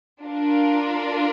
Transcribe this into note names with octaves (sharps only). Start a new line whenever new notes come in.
D4 F4 A#4